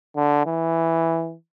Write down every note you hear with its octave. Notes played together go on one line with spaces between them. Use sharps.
D3
E3